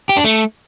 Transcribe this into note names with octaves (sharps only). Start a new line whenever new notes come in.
G4
D4
A3